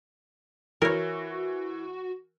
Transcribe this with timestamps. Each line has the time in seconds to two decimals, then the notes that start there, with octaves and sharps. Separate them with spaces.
0.82 E3 F#4 A#4 C#5